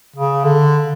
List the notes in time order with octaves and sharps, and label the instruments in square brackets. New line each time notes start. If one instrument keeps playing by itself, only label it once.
[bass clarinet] C#3
D3